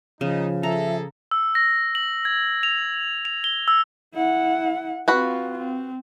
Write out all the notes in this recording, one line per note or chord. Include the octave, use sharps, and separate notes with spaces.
C#3 F3 D#4
G#4 A4 E5 A#5
E6
A#6
F#7
G#6
F7
F7
G7
E6
E4 F#5
C4 F4 F#4 B4
C4